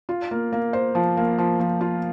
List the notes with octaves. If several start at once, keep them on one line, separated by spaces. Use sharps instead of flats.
F4
A#3
A#3
C5
F3
A#3
F3
F3
F4